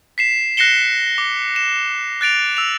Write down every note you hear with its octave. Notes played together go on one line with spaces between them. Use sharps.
B6 C7 E7
F#6 A#6 C7 C#7 E7 G7
D6
E7
F#6 A6 D7 F7
E6 F7